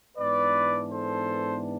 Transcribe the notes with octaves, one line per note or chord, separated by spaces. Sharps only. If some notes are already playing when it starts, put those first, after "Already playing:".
G#2 E3 B3 D4 B4 D5
A4 C5